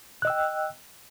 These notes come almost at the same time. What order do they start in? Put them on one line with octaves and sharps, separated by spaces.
F#6 D#5 E6 G5